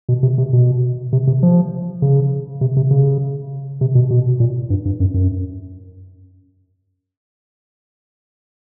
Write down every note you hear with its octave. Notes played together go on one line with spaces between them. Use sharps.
B2
C3
C3
B2
C3
C3
F3
C#3
C3
C3
C#3
C3
B2
B2
A#2
G2
G2
F#2
F#2